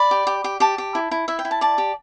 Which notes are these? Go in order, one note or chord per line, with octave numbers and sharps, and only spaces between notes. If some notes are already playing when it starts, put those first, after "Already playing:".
Already playing: D5 B5
G4
G4
G4
G4 A5
G4
E4
E4
E4 E5
G5
E4
A5
D5 A5
G4